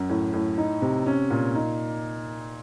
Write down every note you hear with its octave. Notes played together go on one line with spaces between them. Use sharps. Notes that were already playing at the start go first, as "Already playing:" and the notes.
Already playing: F#2
A2
A2
D#4
C3
C#4
A#2
D#4